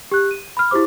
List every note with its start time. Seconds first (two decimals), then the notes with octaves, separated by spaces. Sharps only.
0.11 G4 F#6
0.31 D#7
0.57 B5 F6
0.71 E4 F#4 G4 C5 D6